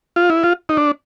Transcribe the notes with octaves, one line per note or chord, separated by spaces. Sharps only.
F4
E4
F4
D#4
D4